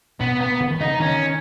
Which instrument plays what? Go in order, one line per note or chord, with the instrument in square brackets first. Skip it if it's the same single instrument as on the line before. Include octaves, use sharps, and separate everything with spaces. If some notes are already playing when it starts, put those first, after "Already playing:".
[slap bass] B2 [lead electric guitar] B3
[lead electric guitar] B3
[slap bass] C#3
D#3
[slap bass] C#3 [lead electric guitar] D#4
[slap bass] D#3 [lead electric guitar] C#4